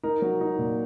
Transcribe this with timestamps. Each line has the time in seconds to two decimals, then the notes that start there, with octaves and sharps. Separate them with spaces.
0.03 D#4 A#4
0.22 F#3
0.41 D#4
0.58 A#2